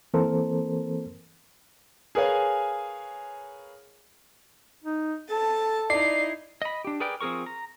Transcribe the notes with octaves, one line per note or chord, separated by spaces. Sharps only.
E3 A#3 C4 A4 A#4 C5
G#4 A#4 B4 C#5 F5 G#5
D#4
A4 A5
D#4 E4 D5 C7
D#5 B5
D4 G4
G#4 A#4 B4 D5 G5
F3 C4 G#4 A#4 C#6
A#5